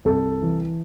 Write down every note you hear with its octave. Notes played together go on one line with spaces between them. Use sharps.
C2 A4
E3